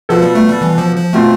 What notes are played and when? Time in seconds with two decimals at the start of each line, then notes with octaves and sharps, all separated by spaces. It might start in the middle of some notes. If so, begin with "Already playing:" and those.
0.09 B2 F3 B3 F4 A4
0.22 G3
0.35 A3
0.48 G3
0.62 E3
0.78 F3
0.96 F3
1.13 B2 G3 A3 C4 F4 C5